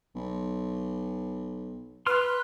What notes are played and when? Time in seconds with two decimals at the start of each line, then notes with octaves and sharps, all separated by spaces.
0.15 B1
2.07 B4 C6 F6